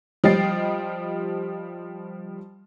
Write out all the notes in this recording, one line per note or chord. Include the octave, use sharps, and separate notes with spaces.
F3 G3 D#5 G5 A6 C7